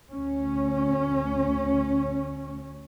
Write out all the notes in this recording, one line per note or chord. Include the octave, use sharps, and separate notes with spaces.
D2 C#4